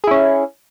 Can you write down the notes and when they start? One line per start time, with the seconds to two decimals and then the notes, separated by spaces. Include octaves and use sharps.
0.04 G#4
0.07 E4
0.11 C#4